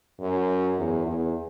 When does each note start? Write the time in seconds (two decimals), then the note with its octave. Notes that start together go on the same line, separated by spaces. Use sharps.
0.20 F#2
0.78 E2
1.06 E2